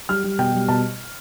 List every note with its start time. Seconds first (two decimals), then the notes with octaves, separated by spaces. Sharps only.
0.09 G3 F6
0.24 G3
0.39 B2 G5
0.54 G3
0.68 B2 A5